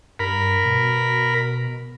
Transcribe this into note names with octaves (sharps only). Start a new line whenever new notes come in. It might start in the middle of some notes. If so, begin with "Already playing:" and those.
G2 A#4 B5
B2